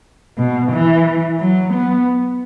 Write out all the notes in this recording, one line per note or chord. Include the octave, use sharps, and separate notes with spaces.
B2
E3
F#3
B3